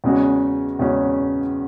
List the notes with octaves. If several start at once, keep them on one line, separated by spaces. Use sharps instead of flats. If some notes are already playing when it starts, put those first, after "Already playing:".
E2 C#3 G#3 C#4 F#4
E2 C#3 G#3 C#4 F#4